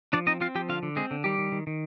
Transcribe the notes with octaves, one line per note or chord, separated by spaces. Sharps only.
F3 D4 D5
C4 D#4 D#5
C4 F4 F5
F3 G4 G5
D3 F4 F5
D3
G#3 C4 G#4
D3
D#3 G3 G4
D#3
D#3
D#3